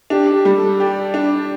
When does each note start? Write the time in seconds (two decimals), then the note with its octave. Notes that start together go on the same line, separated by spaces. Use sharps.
0.10 D4 G4
0.33 G4
0.45 G3
0.57 A4
0.79 G4 D5
1.14 D4